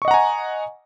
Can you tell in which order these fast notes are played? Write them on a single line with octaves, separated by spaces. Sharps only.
C#6 D#5 F#5 A#5 G#5